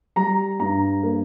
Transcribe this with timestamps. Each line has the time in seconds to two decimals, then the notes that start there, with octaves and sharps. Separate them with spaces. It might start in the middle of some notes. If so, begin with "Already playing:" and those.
0.16 G3 A#5
0.60 G2 A#5
1.03 A#3